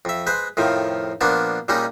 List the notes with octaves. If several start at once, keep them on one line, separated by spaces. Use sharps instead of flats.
F2 E5
G#3 B4 C5
F2 A2 D#3 F3
A#2 F3 A#3 B3 D4
A#2 G3 G#3 C#4 D#4